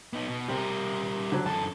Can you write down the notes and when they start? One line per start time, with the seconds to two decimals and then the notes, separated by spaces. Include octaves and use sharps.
0.13 B3 D#4
0.27 B2
0.48 C3 G3 A#4
1.32 D3 F#3
1.46 F#2 A4 A5